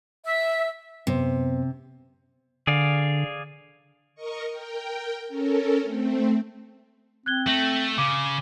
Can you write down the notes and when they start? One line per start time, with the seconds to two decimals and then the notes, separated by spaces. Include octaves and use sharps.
0.25 E5
1.07 F#2 C3 B3 C5
2.67 D3 G#4 D5 F5
4.15 A#4 D#5 C#6
4.50 A#4 G5
5.28 C#4 A4 A#4
5.82 A3 C4
7.26 C4 F#6 G#6 G7
7.47 A3 A#6 F#7
7.98 C#3 D6